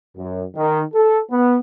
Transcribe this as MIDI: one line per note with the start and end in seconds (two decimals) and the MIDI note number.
0.17 0.44 42
0.56 0.81 51
0.94 1.20 69
1.32 1.59 59